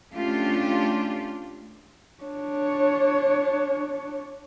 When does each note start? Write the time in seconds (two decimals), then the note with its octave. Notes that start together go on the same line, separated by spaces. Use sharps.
0.13 A3 C#4 D4 F4 G4
2.24 D4 C#5